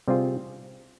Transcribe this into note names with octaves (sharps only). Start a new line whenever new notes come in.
C3 G3 C4 F4 G#4